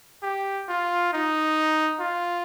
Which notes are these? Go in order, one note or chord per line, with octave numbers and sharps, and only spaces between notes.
G4
F4
D#4
F4